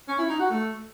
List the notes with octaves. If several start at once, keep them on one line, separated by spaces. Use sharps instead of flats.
C#4
E4
D#4
F#4
A3